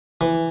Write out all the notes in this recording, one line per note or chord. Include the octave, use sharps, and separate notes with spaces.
E3